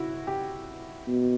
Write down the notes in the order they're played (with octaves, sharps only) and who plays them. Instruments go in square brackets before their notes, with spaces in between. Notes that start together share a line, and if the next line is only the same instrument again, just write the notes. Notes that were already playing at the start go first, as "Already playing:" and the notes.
Already playing: [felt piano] E4 F#4
G4
[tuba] B2